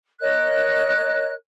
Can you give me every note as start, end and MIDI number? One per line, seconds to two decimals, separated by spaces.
0.20 1.31 70
0.20 1.31 73
0.20 1.31 75
0.20 1.31 90